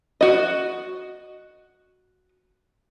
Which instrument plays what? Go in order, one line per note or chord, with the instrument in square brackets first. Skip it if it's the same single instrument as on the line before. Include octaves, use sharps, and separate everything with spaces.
[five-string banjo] F#4 D#5